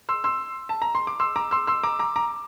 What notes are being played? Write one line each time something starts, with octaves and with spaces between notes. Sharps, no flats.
C6 E6
C6 E6
A5
A#5
C6
D6
C6 E6
A#5 D6
C6 E6
C6 E6
A#5 D6
A#5 D6
A#5 D6